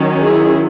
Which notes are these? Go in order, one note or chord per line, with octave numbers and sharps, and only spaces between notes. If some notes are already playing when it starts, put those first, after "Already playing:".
Already playing: D#3 F#3 C#4
E4 G#4